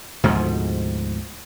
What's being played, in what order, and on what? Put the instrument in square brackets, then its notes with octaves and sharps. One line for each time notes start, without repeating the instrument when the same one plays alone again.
[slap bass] D2 G#2 B2 F3